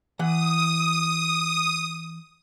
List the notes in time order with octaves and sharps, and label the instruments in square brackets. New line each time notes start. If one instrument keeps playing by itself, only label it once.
[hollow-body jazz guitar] E3 F#5 [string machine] D#6